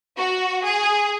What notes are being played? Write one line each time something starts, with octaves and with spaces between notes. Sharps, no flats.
F#4
G#4